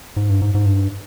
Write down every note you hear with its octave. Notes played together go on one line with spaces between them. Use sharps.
G#2
G2
G#2
G#2
G2